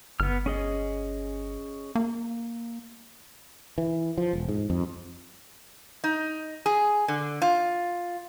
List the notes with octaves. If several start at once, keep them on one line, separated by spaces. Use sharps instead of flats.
G1 B3 F6
C#4 G#4 D#5
A#3
E3
F3
E1
G#2
F2
D#4
G#4
D3
F4